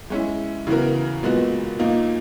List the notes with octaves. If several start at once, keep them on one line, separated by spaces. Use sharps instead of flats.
G#3 C#4 E4
C#3 E3 B3 F#4 A#4
A#2 G#3 B3 F#4
A#2 A#3 D#4